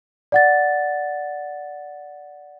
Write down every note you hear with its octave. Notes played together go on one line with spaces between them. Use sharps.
D5 F#5 A6